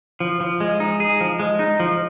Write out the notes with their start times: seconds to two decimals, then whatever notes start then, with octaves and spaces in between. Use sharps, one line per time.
0.20 F3
0.41 F3
0.61 G#3
0.80 D#4
1.00 G#4
1.21 F3
1.40 G#3
1.59 D#4
1.80 F3